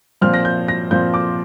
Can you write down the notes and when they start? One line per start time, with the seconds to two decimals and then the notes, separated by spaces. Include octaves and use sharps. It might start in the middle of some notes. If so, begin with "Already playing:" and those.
0.21 A#2 F3 C4 F6
0.34 A#6
0.45 G6
0.68 A#6
0.91 A#2 F3 C4 G6
1.14 D6